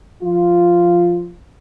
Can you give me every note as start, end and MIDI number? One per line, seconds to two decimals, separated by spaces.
0.23 1.31 53
0.23 1.31 65